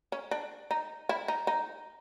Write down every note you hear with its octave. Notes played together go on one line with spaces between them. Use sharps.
C#4
D4
D#4
E4
D#4
D#4